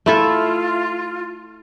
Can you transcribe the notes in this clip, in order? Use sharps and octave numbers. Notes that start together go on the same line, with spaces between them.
A3 E4 F4 A4